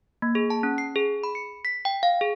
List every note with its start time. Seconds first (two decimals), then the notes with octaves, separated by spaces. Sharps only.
0.22 A#3
0.35 G#4
0.50 A5
0.63 C#4
0.78 C7
0.96 G#4
1.24 B5
1.35 C#7
1.65 B6
1.85 G5
2.03 F5
2.21 G#4